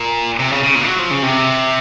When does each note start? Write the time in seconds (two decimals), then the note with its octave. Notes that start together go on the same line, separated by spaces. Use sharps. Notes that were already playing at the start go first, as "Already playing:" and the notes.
Already playing: A#2
0.40 C3
0.52 C#3
0.63 C#3
0.75 A#2
0.86 F#3
0.99 F3
1.11 C#3
1.23 C3